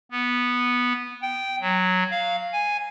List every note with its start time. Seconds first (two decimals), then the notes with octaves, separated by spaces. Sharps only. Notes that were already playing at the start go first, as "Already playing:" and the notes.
0.11 B3
1.22 G5
1.61 F#3
2.11 F5
2.53 G#5